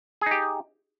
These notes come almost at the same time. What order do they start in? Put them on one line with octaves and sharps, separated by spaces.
G#4 D#4 G4